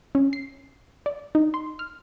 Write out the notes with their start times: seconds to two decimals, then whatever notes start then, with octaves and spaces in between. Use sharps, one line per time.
0.15 C#4
0.33 C7
1.06 D5
1.35 D#4
1.54 C6
1.79 F6